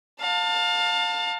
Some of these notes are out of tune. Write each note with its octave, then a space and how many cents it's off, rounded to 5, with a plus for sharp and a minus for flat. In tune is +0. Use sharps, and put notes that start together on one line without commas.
F5 +25 A5 +25